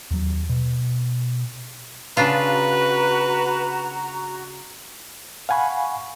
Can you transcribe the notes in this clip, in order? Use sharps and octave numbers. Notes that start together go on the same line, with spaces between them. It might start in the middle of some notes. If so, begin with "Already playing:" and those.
D#2 F#3
B2
C#3 D4 F4 F#4 B4 A#5
F5 F#5 G#5 B5 C#6